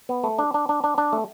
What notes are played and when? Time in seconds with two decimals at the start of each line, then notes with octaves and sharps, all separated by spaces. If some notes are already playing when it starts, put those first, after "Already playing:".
0.09 B3
0.24 A3
0.39 D4
0.54 D4
0.69 D4
0.84 D4
0.98 D4
1.13 A3